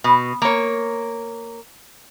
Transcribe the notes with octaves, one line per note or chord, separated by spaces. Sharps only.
B2
A#3 C#5